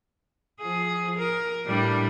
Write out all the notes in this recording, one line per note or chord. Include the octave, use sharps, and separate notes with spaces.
F3 G#4
A#4
A2 G3 D4